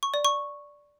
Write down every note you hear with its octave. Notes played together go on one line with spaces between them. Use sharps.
C#6
D5
C#6